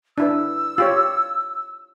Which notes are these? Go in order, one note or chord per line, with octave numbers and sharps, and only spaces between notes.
D4 E4 B4 E6
F4 G4 C#5